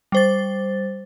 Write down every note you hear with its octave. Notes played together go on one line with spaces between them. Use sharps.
G3 C5 A6